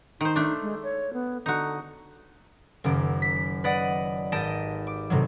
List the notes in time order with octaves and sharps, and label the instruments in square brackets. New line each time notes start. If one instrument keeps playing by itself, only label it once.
[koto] D#3 C5 [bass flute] D#4
[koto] A3 D4
[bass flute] G#3
C#5
B3
[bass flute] D3 [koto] D#4 F#4
[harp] F#1 F#2 D#3 D6
B6
B4 D5 D#5 F#5
G#1 G4 D#5 A5 D7
D6
A2 C3 D#3 F#3